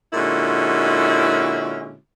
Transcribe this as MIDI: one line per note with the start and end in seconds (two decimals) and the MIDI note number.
0.13 1.96 46
0.13 1.96 50
0.13 1.96 56
0.13 1.96 61
0.13 1.96 64
0.13 1.96 66